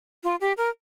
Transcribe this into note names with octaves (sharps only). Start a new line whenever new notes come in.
F4
G4
A#4